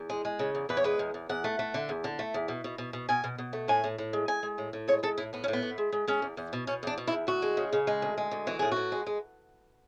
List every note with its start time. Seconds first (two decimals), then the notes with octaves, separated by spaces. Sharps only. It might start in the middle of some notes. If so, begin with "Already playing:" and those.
Already playing: E2
0.10 G#3
0.25 G#3
0.39 C#3
0.55 E2
0.69 E2 B4
0.77 C#5
0.84 G#3 B4
0.99 E2
1.14 E2
1.29 E2 F#5
1.44 A3
1.59 A3
1.74 D3
1.89 E2
2.04 D3
2.19 A3
2.34 E2
2.48 B2
2.64 B2
2.78 B2
2.93 B2
3.09 B2 G#5
3.24 B2
3.38 B2
3.53 A3
3.68 A2 G#5
3.84 A2
3.98 A2
4.13 G#3
4.28 G#3 G#5
4.43 G#3
4.58 A2
4.73 A2
4.88 G#3 C#5
5.03 G#3 A4
5.18 A2 E4
5.33 A2 B3
5.44 C#4
5.48 A2
5.53 B3
5.62 A2
5.78 G#3
5.92 G#3
6.07 G#3 C#4
6.22 E2
6.37 E2
6.53 B2
6.67 B2 C#4
6.83 E2 D4
6.98 B2
7.07 E4
7.12 E2
7.27 D2 F#4
7.42 G#3
7.57 C#3
7.73 C#3
7.87 G#3
8.02 D2
8.18 G#3
8.31 D2
8.47 E3 F#4
8.59 A2 G#4
8.72 A2 F#4
8.92 G#3
9.06 G#3